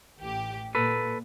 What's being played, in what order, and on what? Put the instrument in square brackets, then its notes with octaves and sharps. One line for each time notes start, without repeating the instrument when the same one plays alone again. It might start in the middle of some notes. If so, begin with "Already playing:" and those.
[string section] A1 G4
[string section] A#2 [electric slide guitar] A4 B4